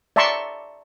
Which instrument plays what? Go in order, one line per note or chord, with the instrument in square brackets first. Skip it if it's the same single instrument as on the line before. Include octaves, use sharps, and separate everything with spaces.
[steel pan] D5 E5 A5 A#5 C6 C#6